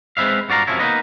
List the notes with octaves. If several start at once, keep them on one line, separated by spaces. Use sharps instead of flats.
G#3 C4 B4 E5 F5
G2 F#4 D5 F5 A#5
F#2 A2 C3 F3 C#4 E4
A#3 B3 D#4 B4 D#5